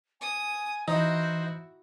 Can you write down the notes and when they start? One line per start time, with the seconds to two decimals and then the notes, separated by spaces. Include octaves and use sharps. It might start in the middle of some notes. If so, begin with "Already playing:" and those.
0.21 G#5 D#6
0.88 E3 D#4 E4 F#4 C5